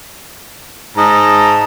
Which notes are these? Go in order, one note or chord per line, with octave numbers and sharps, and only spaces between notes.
G#2 D#5 A5 A#5